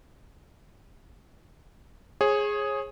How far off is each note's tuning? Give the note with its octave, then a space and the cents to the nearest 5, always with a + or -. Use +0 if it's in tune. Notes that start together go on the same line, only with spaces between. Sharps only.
G#4 +0 C#5 -35